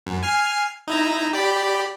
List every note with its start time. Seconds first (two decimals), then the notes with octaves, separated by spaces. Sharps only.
0.07 F#2
0.23 G#5 F6 C7
0.88 D#4 E4 A#5
1.33 G4 D5 B5